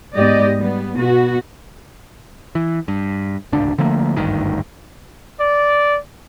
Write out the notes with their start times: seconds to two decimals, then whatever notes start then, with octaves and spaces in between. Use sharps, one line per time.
0.17 G#2 B3 G4 D5 D#5
0.57 G3 B3
0.97 B2 B3 F#4
2.55 E3
2.88 G2
3.52 D1 G#1 C#2 D4
3.78 D3 F3 A3 A#3
4.17 G#1 D2 G2 D#3
5.40 D5